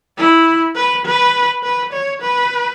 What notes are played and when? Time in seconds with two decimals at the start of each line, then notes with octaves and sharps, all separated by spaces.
0.18 E4
0.76 B4
1.06 B4
1.63 B4
1.93 C#5
2.22 B4